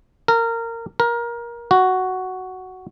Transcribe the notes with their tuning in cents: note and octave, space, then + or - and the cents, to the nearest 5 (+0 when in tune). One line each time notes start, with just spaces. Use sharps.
A#4 -20
A#4 +20
F#4 +5